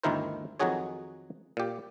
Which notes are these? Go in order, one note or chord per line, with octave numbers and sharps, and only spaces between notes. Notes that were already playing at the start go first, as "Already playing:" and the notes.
G1 D2 D#3 E4 A#4 C5
F2 D#3 F#3 F#4 G#4 C#5
A#2 G4